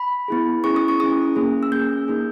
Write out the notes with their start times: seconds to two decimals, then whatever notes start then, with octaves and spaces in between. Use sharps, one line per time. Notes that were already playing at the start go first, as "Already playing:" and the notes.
Already playing: B5
0.28 B3 E4 G#4
0.64 C#4 E4 G#4 C#6
0.76 D#6
0.88 C#6
1.00 C#4 E4 G#4 D#6
1.36 A#3 C#4 G#4
1.63 E6
1.72 A#3 C#4 G#4 G6
2.08 A#3 D#4 G#4